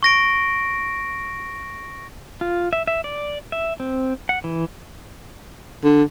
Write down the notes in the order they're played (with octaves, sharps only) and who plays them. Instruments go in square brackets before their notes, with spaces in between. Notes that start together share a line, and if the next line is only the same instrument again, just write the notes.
[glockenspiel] C#6 A#6 D7
[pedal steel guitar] F4
E5
E5
D5
E5
C4
F#5
E3
[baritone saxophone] D3